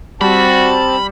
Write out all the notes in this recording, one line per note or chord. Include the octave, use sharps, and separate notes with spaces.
G3 C4 F#4 A5 B5